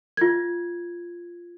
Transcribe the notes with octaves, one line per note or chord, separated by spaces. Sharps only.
F4 G#6